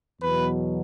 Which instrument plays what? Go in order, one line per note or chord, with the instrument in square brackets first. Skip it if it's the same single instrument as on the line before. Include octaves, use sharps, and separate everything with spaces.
[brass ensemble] E2 B2 F#3 B4